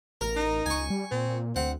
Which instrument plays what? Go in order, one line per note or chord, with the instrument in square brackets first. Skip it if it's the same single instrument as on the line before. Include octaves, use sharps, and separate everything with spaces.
[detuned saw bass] A1 [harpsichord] A#4
[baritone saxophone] D#4
[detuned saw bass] C#2 [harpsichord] G#5 C#6
[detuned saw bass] G3
[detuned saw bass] A#2 [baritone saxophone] C4
[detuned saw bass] D2 [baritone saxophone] C4 [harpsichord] F#5